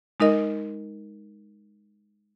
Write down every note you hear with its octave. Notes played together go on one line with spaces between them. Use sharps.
G#3 D#4 A#4 D#5